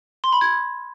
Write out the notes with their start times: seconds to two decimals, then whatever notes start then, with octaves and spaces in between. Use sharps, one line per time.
0.24 C6
0.33 B5
0.41 G#6